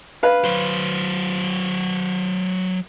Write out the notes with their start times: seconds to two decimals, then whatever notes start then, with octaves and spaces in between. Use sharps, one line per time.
0.23 B4 F5
0.45 F#3 C5